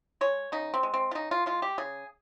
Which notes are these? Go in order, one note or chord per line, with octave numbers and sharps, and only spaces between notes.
G#3 C#5
C#3 D#4
C4
G#3
C4
F4
C#3 D#4
F4
G#3 F4
G4
C#3 G#4